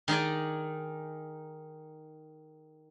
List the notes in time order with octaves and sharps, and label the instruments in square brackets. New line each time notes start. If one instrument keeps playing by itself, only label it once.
[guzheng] D#3 D#4 G#4 D5